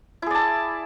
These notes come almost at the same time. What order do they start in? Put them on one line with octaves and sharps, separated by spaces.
E4 G#4 D5 A5